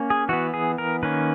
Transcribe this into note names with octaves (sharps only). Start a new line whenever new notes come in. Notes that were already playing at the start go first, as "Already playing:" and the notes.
Already playing: A#3 C#4
G#4
E3 B3 F#4
G#4
A#4
D#3 A#3 C#4 B4